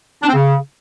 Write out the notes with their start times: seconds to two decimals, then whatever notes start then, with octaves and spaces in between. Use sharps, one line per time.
0.23 D4
0.29 C4
0.35 C#3